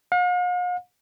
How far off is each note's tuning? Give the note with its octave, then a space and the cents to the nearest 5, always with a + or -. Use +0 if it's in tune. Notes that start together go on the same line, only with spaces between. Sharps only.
F5 +45